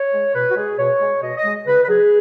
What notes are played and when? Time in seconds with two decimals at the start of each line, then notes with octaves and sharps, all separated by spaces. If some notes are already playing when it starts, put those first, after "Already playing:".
Already playing: C#5
0.13 G#3
0.34 B2 B4
0.49 F#4
0.56 G#3 G#4
0.78 B2 C#5
1.01 G#3
1.22 B2 D#5
1.37 D#5
1.44 G#3
1.67 C#3 B4
1.84 B4
1.88 F#3 G#4